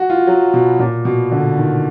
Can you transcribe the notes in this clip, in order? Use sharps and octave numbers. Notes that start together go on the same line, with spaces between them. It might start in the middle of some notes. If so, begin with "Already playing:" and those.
Already playing: F#4
F4
F#3
B2
A#2
B2
D3
D#3